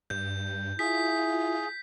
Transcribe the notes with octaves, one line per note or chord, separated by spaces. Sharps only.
G2 G6
E4 F4 G#4 B6